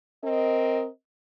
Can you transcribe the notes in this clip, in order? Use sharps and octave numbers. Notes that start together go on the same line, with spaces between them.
C4 A#4 D#5